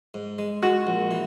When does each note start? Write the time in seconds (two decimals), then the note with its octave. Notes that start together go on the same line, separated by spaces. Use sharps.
0.14 G#2
0.39 G#3
0.62 G#3 F#4
0.87 A#1
1.11 E3